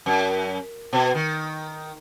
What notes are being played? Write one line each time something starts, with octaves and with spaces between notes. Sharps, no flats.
F#2
B2
D#3